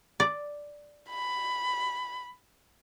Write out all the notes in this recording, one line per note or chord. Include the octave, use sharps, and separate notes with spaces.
D5
B5